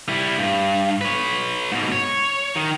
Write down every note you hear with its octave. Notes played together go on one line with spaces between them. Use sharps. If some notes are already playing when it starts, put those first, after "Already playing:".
G3 E4
G2
B4 C#5
G#2 B2
C#5
D#3